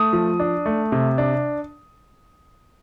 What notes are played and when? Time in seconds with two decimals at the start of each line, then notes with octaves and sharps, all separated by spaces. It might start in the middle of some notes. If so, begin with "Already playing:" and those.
Already playing: A3 D#6
0.13 F3
0.40 D4
0.66 A3
0.92 C3
1.18 D4